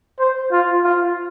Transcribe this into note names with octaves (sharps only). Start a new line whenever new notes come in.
C5
F4
F4